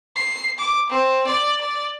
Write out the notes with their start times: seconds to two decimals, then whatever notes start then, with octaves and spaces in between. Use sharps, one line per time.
0.16 C7
0.58 D6
0.90 C4
1.27 D5
1.60 D5